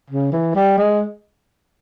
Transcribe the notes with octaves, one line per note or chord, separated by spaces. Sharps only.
C#3
E3
G3
G#3